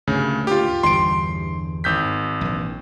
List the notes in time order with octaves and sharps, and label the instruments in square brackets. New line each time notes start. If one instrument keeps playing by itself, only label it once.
[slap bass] D2 G2 A#2 [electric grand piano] C#3
[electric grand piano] F4 G4
[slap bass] G1 E2 G2 [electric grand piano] C6 D7
[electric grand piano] G#1 G6 B6
[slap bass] A#1 E3